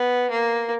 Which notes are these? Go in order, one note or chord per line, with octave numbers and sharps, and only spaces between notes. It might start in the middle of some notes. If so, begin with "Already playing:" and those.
Already playing: B3
A#3